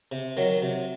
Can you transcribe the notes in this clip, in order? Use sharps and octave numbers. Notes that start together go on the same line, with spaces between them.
C3
D#3 F#3
C3